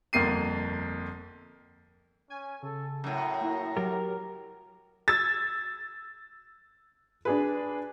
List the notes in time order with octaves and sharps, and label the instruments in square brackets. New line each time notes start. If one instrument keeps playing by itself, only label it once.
[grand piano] G1 F2 A#3 C7 D#7
[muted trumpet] C#4 [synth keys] G#5
[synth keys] C#3 [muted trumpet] A4
[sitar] F#2 A2 [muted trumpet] A#5
[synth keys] A#3 E4 F#4
[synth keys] F#3 [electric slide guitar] G4 A#4
[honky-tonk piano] E6 G#6 A6
D4 G#4 B4